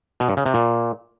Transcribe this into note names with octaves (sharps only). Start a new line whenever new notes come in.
B2
G2
C#3
C3
A#2